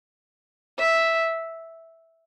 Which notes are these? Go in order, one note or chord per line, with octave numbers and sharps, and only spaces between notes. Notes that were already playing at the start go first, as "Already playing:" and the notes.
E5